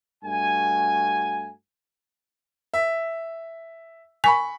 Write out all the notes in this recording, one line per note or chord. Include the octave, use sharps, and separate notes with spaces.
G2 A3 F#4 G#5
E5
G#5 B5 C#6 B6